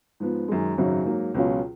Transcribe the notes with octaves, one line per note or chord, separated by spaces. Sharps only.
G#2 F3 B3
F#2 D#3 G#3
G#1 F#2 C#3 F#3
G#2 F#3 A#3
C#2 B2 F#3 C#4 F4